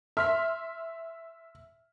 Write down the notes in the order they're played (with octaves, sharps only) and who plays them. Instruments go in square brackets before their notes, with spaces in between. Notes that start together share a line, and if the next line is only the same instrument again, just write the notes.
[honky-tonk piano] E5 C6 B6 [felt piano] F6